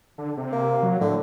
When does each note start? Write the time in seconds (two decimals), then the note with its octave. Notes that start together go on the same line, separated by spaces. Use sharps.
0.18 D3
0.37 C3
0.52 A#3
0.83 F#3
1.01 A2 D3